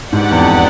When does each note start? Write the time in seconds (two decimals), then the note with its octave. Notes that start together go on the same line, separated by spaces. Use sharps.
0.12 G#2 D4 G4 B4 D5 F#5
0.31 E2
0.38 F2